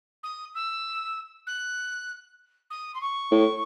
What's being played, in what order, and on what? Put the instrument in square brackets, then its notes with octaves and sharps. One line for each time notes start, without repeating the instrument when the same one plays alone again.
[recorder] D#6
E6
F#6
D#6
C6
C#6
[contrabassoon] A2